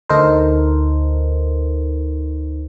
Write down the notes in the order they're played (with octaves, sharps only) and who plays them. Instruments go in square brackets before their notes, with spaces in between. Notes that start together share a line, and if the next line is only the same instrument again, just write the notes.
[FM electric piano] D2 D#4 A4 A#4 C5